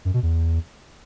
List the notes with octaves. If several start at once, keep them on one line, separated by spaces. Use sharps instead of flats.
F#2
B2
E2